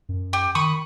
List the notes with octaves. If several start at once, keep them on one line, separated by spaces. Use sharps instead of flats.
F#2
G4
D#3 B5 C#6 D#6